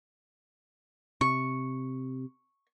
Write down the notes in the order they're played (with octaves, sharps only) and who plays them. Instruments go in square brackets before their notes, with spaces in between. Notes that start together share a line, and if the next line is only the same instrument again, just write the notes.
[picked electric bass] C3 [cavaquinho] C#6